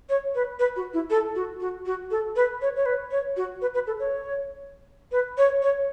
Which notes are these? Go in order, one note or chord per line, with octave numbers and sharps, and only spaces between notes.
C#5
B4
B4
F#4
E4
A4
F#4
F#4
F#4
A4
B4
C#5
C#5
B4
C#5
F#4
B4
B4
A4
C#5
B4
C#5
C#5